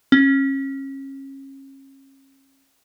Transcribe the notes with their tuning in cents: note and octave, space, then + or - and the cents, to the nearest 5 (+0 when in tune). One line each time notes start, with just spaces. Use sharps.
C#4 -35